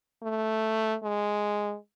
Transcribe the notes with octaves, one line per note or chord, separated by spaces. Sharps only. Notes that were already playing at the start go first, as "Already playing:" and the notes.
A3
G#3